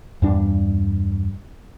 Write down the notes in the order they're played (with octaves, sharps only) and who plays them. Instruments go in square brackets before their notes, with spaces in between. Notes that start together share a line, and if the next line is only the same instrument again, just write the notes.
[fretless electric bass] E2 G2 D4